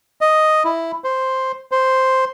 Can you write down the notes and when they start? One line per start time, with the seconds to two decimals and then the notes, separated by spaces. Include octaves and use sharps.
0.21 D#5
0.64 E4
1.04 C5
1.72 C5